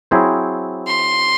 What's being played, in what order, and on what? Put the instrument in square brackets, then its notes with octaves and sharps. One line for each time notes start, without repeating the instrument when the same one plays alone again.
[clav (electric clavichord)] F#3 C4 E4 G#4 C5
[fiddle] C6